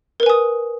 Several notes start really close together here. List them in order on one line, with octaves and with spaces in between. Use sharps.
A#4 B4 G#5 D#6